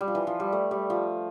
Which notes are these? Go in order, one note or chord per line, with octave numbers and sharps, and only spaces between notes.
G3
F3
E3
F3
G3
A3
G3
F3